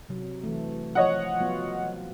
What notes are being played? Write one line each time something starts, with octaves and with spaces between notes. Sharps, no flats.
C3 F#3
E3 A3
F3 C#5 D#5 F#5
F#3 B3 F4